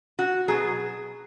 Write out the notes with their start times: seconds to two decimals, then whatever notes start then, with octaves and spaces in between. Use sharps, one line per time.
0.19 F#4
0.48 B2 F#3 G#4